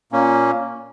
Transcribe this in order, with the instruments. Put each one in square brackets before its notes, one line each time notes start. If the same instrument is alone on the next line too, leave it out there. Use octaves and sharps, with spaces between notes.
[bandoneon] A#2 A#3 C#4